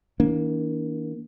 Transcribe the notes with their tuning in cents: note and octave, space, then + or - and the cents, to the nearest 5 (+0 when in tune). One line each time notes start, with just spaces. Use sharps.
D#3 +45 A#3 +15 D4 -35